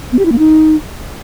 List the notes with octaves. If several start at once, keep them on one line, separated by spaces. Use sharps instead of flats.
B3
G4
E4
A#3
D#4